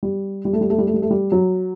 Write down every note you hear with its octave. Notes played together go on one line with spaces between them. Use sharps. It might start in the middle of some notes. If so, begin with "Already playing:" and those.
G3
G3
A3
G3
A3
G3
A3
G3
A3
G3
F#3